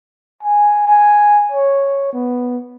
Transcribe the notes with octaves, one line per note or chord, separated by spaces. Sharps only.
G#5
G#5
C#5
B3